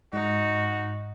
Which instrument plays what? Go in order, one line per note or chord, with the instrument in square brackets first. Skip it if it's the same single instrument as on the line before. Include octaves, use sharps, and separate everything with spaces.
[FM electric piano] G#2 [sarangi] D#4 [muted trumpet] F#4